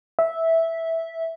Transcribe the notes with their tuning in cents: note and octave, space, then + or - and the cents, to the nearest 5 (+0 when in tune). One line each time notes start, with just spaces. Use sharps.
E5 -10